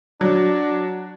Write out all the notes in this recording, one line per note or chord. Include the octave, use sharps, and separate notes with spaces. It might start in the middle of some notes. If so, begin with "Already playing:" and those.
F#3 D4